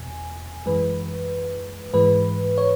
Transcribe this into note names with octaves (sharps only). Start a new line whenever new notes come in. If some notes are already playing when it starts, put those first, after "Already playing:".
Already playing: E2 B2 G#5
F#2 E3 G#3 B4
G#2 E3 G#3 B4
C#5